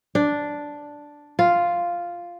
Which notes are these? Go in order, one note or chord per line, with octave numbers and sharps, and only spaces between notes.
D4
F4